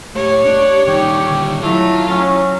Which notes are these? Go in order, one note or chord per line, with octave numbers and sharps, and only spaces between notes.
A2 A3 G4 C#5
D4
D#3 G3 D#4 G4
D3
F#3 A3 E4 F4
C#4